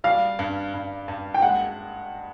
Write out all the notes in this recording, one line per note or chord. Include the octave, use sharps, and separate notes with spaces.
G3 F5
G2
G2
G2
G5
G#3 F#5